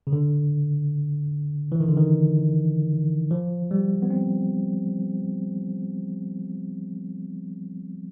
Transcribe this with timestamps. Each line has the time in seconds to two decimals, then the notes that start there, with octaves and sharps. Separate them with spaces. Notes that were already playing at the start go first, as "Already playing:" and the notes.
0.07 C#3
0.12 D3
1.72 E3
1.80 D#3
1.89 D3
1.97 D#3
3.31 F3
3.71 G3
4.02 B3
4.10 C4